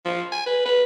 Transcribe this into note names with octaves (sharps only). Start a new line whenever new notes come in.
F3
G#5
B4
B4